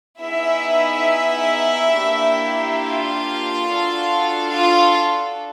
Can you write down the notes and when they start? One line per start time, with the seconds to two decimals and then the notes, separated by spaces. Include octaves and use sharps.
0.21 B3 D#4 E4 G#4 E5
1.93 A#3 D4 G4
2.79 F4 F5
3.65 D4 F#4 A4
4.50 F4 F5